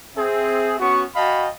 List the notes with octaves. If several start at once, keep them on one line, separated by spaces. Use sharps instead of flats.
C4 G#4 E5
B3 C#4 F#4 C#6
F#4 D#5 F5 G5 A5 B5